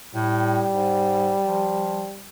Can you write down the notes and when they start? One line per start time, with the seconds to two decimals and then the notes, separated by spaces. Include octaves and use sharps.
0.15 A2 G3
0.71 G#2
1.45 F3